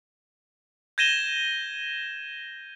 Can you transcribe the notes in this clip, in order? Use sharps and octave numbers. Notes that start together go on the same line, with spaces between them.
G6 G#6 A#6 D#7 E7 G7